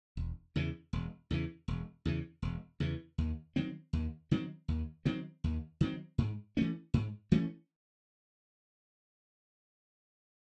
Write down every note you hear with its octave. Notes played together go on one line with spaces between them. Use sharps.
E1
E2 C#3 E3
E1
E2 C#3 E3
E1
E2 C#3 E3
E1
E2 C#3 E3
D#2
D#3 F#3 C4
D#2
D#3 F#3 C4
D#2
D#3 F#3 C4
D#2
D#3 F#3 C4
G#2
E3 A3 C#4
G#2
E3 A3 C#4